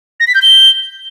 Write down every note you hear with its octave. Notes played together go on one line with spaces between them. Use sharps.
A#6
B6
G6
G7